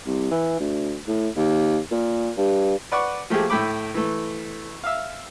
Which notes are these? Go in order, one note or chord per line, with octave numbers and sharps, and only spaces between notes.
C2
E3
D2
A2
D#2
A#2
G2
B4 D5 F#5 C#6
F3 A3 A#3 G4 G#4
A2 A3 G5 B5 D6
E3 A3
E5 F5